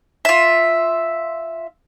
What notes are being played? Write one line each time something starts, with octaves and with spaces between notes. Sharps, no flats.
F4 E5